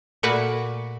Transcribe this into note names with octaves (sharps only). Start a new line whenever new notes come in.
A#2 A3 F#4 B4 D5